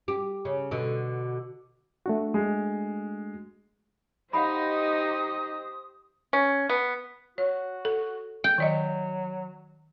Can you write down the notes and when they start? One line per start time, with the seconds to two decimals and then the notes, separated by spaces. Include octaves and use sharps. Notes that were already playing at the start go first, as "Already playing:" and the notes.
0.08 G4
0.45 C#3
0.71 B2 D3
2.06 A3 D4 F#4
2.34 G#3
4.33 D#4 G4 C5 D#5 F5 F#5 B5 D#6
6.33 C#4
6.70 B3
7.38 F#4 C#5
7.85 A4
8.44 G5
8.58 D#3 F#3 D5 D#5